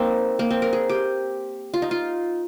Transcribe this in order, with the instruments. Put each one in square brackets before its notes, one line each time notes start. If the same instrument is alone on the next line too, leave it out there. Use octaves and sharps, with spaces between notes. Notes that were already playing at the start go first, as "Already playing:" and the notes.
Already playing: [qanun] A#3 C4 D#4
A#3
C4
A#4
G#4
G4
F4
D#4
F4